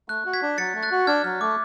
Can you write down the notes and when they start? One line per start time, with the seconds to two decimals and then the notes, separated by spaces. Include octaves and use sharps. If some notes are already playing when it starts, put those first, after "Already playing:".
0.09 A3 F#6
0.26 F#4
0.33 G#6 B6
0.42 D4
0.58 F#3 A6 C#7
0.74 A3
0.83 F#6 A6
0.91 F#4
1.07 D4 F6 G#6
1.24 F#3 F6
1.41 A3 D6